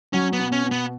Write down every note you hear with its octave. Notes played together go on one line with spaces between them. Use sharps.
F#3 C#4
B3
B2
C#4
B2
B3